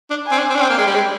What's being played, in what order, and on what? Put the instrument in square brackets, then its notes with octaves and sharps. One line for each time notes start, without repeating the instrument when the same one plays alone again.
[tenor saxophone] D4
[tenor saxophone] C4 [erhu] G#5
[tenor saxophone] D4
C4
D4
[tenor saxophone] C4 [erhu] G5
[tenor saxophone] A#3
G#3
G3
G#3